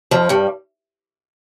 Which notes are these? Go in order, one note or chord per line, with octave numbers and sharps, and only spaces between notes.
F2 F3
G2 G3